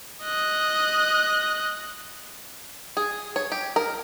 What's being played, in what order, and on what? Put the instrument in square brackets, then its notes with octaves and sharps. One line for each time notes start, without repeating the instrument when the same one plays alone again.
[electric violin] D#5 F#6
[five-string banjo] G#4
C#5
G4
A#4